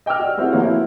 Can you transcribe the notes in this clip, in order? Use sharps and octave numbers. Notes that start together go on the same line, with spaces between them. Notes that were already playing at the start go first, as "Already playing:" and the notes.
D#5 G5 D6 E6 F6
F#4 D5
G3 C4 E4 F#4 G#4
F3 A#3 F#4 B4 C#5 F5
E4